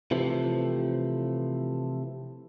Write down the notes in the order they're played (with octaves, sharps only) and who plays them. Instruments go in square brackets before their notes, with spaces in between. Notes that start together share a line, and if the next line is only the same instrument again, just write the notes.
[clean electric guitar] C3 E3 F3 A3